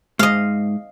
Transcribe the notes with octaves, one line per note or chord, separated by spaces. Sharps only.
G#2 D#5 F5